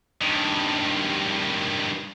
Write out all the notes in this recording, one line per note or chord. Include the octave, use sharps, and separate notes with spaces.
G2 D#3